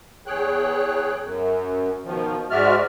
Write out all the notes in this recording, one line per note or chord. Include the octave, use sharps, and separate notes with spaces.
E2 G#4 C#5 G5 F#6
F#2
B2 D#3 F3
G#2 G#3 F#4 D5 E5 F6